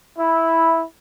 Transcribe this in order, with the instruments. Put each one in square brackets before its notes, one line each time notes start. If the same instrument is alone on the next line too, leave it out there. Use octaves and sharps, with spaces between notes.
[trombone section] E4